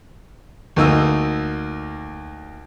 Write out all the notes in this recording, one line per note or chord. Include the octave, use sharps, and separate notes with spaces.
D2 A#3 D#4 E6